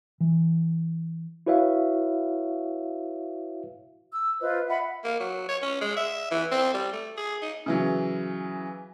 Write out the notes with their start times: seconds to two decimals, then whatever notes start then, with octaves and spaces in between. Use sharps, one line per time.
0.20 E3
1.46 E4 F#4 B4 C#5 E5 F5
4.12 E6
4.40 F4 B4 C5 D#5
4.68 D#5 E5 F#5 B5
5.04 A#3
5.20 F#3
5.49 C#5
5.62 C#4
5.81 G#3
5.97 E5
6.31 E3
6.52 C4
6.74 G3
6.93 A3
7.17 G#4
7.42 D#4
7.66 C#3 E3 F#3